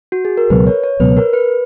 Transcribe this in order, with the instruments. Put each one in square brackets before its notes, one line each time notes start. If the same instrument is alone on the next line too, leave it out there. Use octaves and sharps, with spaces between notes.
[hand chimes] F#4
G#4
A#4
[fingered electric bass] C#2 B2 F#3 B3 [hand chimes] B4
[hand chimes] C#5
C#5
[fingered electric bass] C#2 B2 F#3 B3 [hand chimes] B4
[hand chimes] A#4
B4